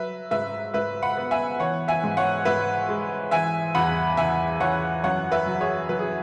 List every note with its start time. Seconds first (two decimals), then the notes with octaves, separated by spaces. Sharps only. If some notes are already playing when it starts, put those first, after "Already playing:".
Already playing: F#3 B4 E5
0.31 G#2 B4 E5
0.74 G#2 B4 E5
1.03 F#5 B5
1.17 B3
1.31 E5 G#5
1.60 E3 C#5 F#5
1.88 E5 G#5
2.04 G#2
2.17 C#5 F#5
2.45 G#2 B4 E5
2.89 G#3
3.31 E3 E5 G#5
3.75 E2 F#5 B5
4.17 E3 E5 G#5
4.60 E3 C#5 F#5
5.04 F#2 C#5 F#5
5.32 B4 E5
5.46 F#3
5.61 G#4 C#5
5.89 F#3 B4
5.99 G#4